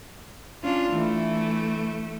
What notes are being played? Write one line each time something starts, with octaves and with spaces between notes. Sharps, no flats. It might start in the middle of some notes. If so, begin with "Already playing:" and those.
C#4 D4 F4
E3 A3